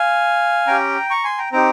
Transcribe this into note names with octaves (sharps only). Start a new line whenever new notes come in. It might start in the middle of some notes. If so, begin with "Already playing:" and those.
Already playing: F5 G#5
C#4 G4 G5 A#5
A#5 C#6
G#5 C6
G5 A#5
C4 D#4 G4 G5 A#5